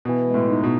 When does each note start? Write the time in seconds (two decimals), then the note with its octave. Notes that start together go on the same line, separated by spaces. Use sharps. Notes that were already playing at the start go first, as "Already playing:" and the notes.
0.05 B2 E3
0.27 G#3
0.34 A2
0.49 D#4
0.63 B2